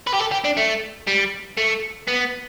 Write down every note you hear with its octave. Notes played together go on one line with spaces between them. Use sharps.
B4
G4
A4
G4
D4
A3
G3
A3
B3